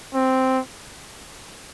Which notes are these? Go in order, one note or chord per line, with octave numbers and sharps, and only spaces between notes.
C4